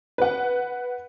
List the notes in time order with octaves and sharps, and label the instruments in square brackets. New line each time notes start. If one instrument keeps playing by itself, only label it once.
[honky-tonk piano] B4 F#5